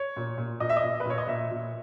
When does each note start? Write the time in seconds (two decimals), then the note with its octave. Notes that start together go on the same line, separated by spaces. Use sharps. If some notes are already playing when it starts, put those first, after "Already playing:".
Already playing: C#5
0.16 A#2
0.38 A#2
0.60 A#2 D#5
0.69 E5
0.77 D#5
0.84 A#2
1.00 B4
1.06 A#2 C#5
1.18 D#5
1.27 A#2 E5
1.51 A#2